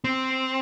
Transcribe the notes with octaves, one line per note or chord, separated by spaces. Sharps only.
C4